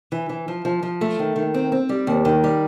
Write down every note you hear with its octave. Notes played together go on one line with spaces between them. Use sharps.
E3
E3
F3
F3
F3
A3
D#3
D#3
C4
C4
G3
D#2
D#3
G3